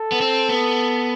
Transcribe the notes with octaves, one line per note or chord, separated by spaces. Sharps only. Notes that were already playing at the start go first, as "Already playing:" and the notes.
Already playing: A4
B3
C4
B3